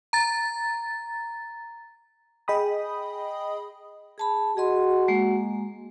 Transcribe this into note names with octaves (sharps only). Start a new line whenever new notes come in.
A#5 A6
G#4 D#5 G5 B5 D#6
G#4 A5 B5
F#4 G#4 D#5 C6
G#3 A#3